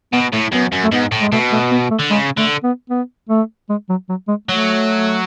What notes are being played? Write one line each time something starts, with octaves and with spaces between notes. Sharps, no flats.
B2 B3
A2 A3
F#2 B3
F#2
A3
G#2 B3
A2
G#3
B2 A3
A3
B3
A3
D3
C#3 G#3
D3 A3
B3
B3
A3
G#3
F#3
F#3
G#3
F#3 A3